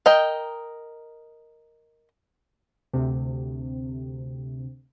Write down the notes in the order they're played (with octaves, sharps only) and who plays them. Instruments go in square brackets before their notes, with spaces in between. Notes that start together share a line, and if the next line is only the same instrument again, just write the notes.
[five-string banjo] A#4 D#5 G5
[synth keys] D2 C3